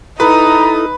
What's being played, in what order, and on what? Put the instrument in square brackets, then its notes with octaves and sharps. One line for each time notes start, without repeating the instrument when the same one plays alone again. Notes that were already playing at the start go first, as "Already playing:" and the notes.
[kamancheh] D#4 D#6 [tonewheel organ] E4 A4 [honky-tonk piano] B4 [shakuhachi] A#5